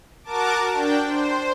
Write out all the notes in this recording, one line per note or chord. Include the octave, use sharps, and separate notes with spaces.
F#4 A#4 A5 D6
D4 G5
C5